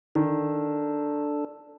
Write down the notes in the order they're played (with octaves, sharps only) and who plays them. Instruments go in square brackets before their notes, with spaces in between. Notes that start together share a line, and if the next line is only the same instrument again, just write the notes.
[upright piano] D#3 [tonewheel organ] D4 A4